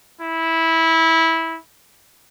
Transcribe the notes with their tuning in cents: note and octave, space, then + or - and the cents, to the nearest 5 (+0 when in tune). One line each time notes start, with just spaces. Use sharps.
E4 -15